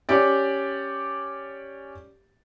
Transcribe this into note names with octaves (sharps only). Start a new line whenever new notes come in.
C#4 G4 D5